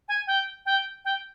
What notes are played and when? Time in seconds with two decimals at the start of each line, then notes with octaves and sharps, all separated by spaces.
0.08 G#5
0.27 G5
0.66 G5
1.05 G5